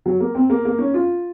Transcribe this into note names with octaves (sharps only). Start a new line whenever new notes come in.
F#3
A#3
C4
A#3
A#3
C#4
F4